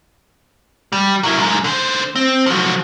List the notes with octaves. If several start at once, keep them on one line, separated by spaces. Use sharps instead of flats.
G3
F#3 E4
F#2 G#3
D3 C5
C4
F3 F#3